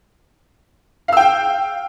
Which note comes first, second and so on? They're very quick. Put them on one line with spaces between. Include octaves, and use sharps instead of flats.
F5 E6 G5